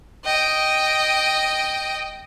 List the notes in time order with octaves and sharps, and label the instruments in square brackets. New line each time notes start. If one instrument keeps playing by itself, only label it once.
[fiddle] D#5 G5